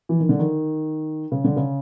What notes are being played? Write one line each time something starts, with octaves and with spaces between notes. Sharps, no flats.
E3
D#3
D3
D#3
C#3
D3
C#3